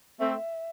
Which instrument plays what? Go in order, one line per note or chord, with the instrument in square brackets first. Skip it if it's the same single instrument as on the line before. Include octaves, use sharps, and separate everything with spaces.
[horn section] A3 C4 [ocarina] E5